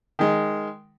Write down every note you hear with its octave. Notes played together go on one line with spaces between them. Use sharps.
D#3 G#3